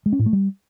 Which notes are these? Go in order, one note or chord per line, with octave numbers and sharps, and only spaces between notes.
G#3
C#4
A2
A3
G3